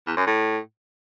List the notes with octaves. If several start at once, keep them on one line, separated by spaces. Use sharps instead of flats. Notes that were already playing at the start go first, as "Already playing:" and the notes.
E2
F#2
A2